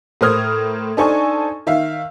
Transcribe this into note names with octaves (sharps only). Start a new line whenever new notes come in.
A2 A#4 C5 D#6 F6 G#6
D4 D#4 A4 C5 G#5 C#6
D#3 E5 F5